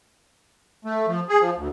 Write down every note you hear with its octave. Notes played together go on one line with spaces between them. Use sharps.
A3
F3
G#4
F3
D2